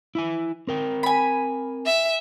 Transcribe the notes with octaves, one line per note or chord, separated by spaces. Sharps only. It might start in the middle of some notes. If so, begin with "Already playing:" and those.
E4 E5 G#5
C4 A#4 G5
G#5 B5
E5